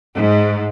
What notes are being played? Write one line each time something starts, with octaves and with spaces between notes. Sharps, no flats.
G#2